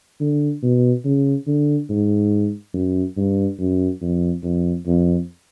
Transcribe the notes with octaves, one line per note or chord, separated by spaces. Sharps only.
D3
B2
C#3
D3
G#2
F#2
G2
F#2
F2
F2
F2